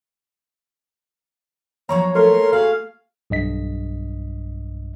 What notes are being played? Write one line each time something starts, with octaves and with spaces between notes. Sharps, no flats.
F3 F#3 A#3 C#5 A#5 C#6
A3 A#4 C6
A#3 F#4 G#4 F5
B1 G2 D#5 B6